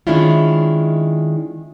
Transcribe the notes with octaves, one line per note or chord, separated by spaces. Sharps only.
D#3 G#3 C#4 D4 E4 F4